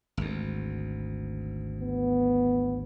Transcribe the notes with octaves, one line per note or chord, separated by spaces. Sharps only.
G#1 D2
B3